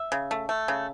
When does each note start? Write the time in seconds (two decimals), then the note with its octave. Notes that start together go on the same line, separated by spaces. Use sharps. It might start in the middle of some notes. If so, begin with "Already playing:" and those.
Already playing: E5
0.12 C#3
0.31 A3
0.49 A3
0.68 C#3